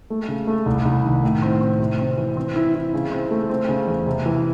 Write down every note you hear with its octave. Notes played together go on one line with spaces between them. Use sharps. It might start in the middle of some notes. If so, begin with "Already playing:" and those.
A3
C#3
A3
C2
C2
D#3
A2
C4
C4
C3
C4
E3
C4
E4
E4
C#3
C4
A3
C4
C#3
E2
C3
E3